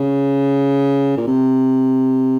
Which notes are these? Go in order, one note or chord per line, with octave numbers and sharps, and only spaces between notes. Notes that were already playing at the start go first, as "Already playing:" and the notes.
Already playing: C#3
A#2
C3